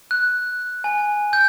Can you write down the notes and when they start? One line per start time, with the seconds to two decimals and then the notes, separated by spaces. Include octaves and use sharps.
0.11 F#6
0.84 G#5
1.33 G6